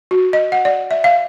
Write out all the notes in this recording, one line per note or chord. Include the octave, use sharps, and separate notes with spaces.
F#4
D#5
F#5
D5
E5
F5